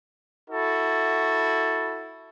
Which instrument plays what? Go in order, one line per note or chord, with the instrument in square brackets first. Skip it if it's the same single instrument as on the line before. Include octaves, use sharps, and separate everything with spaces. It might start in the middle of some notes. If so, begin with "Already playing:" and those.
[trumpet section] E4 F#4 A4